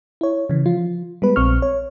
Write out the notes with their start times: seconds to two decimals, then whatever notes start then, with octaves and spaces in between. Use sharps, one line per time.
0.21 E4 C#5
0.49 C#3 E3
0.66 F3 F4
1.22 G3 G#3 B3 B4
1.36 A#1 C4 C#6 F6
1.62 C#5